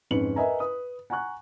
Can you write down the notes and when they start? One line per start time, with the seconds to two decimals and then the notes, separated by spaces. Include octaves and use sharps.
0.11 F2 G#2 C#4 B4 C#7 F#7
0.36 A#4 B4 D#5 E5 G#5 A#5
0.60 B4 D#6
1.10 F#5 G#5 A#5 C#6 F#6